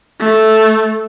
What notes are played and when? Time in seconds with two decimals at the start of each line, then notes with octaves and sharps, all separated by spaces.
0.20 A3